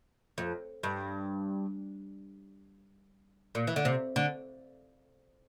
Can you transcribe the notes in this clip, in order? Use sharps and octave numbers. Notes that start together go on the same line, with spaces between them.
F2
G2
A#2
E3
D3
C3
D3